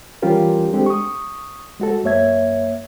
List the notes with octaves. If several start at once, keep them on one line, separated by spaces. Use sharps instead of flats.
E3 G3 C#4 F4 G4 A#4
G#3 C4 D4 G4 A4
C#6 D#6
G#3 F#4 A4
F#2 A#3 C#5 E5 G#6